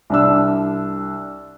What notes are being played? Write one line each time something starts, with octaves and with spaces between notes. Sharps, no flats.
C2 D4 E6